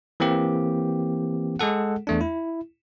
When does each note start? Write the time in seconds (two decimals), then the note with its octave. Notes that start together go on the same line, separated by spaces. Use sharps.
0.20 E3 A#3 C4 G4
1.59 G#3 G#4 A4 F#5
2.07 E2 A3 D4
2.21 E4